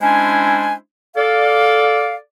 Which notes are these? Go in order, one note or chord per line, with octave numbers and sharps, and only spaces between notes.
G#3 C#4 D4 E4 C5 G#5
A4 D5 F5